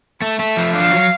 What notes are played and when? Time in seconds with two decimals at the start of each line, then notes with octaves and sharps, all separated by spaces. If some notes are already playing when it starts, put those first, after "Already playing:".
0.22 A3 E5
0.39 A3
0.57 F3
0.74 D4 F5
0.92 F#3